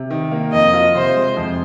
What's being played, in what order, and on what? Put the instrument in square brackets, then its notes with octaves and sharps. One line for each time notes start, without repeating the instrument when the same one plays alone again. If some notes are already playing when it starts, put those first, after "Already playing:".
Already playing: [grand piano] C3
D#3
A#3
[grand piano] F2 [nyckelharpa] D#5
[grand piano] F4
[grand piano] C3 [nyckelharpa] C5
[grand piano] G#3
F2